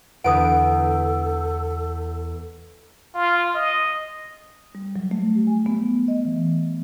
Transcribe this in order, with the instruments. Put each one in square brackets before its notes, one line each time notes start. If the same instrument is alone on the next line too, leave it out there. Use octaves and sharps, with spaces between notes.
[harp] E2 [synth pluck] D3 B4 D7 [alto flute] A4 [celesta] F#5 D#6
[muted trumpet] F4
D#5
[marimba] G3
F#3
A3
G4
G#5
B3
D#5
E3